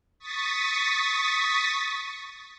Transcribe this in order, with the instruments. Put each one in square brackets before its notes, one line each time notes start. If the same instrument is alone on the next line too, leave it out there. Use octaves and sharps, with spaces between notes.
[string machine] C#6 D#6 A6 B6